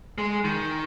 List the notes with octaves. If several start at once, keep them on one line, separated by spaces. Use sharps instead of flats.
G#3
D#3